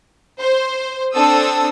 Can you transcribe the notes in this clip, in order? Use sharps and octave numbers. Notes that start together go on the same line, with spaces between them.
C5
C4 D4 A4 D#6 E6